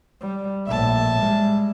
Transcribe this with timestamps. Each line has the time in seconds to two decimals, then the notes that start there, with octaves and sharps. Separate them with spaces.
0.21 G3
0.67 A#1 A2 E5 A5
1.18 G3 G#3